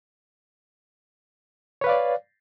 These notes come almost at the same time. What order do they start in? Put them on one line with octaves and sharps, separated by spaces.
C#5 B4 F5 D5